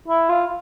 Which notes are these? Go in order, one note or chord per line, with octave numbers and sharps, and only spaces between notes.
E4
F4